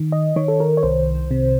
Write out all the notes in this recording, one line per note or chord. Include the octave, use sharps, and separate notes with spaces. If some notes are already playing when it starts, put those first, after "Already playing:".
Already playing: D#3
D#5
D#3 C#5
A4
A#4
C#5
C2 C5
C3